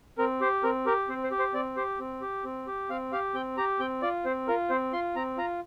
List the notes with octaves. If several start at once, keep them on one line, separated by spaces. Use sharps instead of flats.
C4 A#4
G4 C5
C4 A#4
G4 A#4
C4 C5
C5
G4
C5
C4 D5
G4 C5
C4
G4
C4
G4
C4 F5
G4 F5
C4 G5
G4 A#5
C4 G5
F4 D5
C4 C5
F4 A#4
C4 C5
F4 C6
C4 A#5
F4 A#5